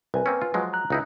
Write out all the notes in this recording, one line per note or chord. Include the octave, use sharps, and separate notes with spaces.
C2 B4 G#5
A#3 C4 C#4
F4
F3 F#3 G#3
A#5 F#6
C#2 D#4 E4